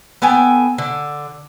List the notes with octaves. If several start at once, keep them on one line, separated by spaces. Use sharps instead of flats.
B3 A4 G5 G#5
D3